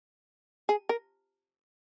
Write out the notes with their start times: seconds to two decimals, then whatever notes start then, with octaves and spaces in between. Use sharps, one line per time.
0.69 G#4
0.89 A#4